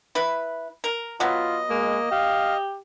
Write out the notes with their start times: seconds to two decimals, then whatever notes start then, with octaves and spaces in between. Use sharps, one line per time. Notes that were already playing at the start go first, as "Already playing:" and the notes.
0.15 E4 B4
0.84 A#4
1.20 F#3 B3 F4 D#5
1.70 G#3 A#3
2.11 G4 F5